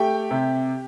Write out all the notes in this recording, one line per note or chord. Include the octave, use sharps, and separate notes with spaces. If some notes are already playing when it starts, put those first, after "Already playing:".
Already playing: A3 G4 G5
C3